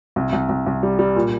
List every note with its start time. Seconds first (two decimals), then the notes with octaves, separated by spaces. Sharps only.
0.16 C2
0.33 C2
0.49 C2
0.66 C2
0.83 G3
0.99 G3
1.16 A#2